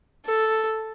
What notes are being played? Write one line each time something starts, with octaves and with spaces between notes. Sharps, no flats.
A4